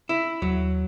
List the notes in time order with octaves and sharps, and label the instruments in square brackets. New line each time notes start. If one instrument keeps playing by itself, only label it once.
[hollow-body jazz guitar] E4
[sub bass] D#2 [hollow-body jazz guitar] F#3